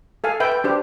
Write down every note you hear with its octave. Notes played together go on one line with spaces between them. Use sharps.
A4 F5 G#5
B4 E5 G5
G5
D4 G4 C5